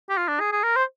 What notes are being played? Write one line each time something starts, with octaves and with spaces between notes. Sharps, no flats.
G4
F4
D4
G#4
G#4
A#4
C5